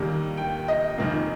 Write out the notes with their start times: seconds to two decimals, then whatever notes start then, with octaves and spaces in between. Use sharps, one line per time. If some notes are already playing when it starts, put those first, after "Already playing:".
Already playing: D#2 D#3 G3 A#3
0.37 G5
0.68 D#5
0.98 F1 D#2 D#3 A#3